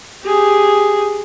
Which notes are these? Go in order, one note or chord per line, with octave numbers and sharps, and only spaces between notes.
G4 G#4